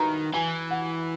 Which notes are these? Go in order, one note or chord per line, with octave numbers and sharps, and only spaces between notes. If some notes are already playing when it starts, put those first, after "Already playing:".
Already playing: D#3 B4 A#5
E3 G#5
F#5